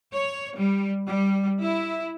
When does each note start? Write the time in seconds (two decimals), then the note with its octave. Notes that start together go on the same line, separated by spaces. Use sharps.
0.13 C#5
0.55 G3
1.07 G3
1.62 E4